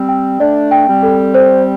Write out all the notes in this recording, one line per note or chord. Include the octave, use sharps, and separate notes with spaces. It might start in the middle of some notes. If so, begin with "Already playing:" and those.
Already playing: G3 C4
G5
A3 D4 D5
G5
G3 C4
A4
C5